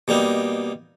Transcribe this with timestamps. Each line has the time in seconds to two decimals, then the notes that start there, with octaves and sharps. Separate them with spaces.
0.08 B2 G3 A#3 D#4